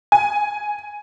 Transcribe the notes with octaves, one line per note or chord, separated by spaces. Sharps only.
G#5